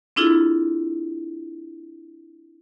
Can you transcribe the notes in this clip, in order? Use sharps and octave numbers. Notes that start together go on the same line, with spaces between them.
C4 D4 E4 F4 G#4 A4